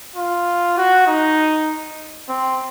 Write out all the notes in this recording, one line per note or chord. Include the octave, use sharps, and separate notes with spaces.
F4
F#4
D#4
C4